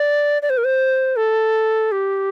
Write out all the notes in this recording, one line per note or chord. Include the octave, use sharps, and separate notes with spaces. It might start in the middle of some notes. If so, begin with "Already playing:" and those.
Already playing: D5
D5
C5
A#4
C5
A4
G4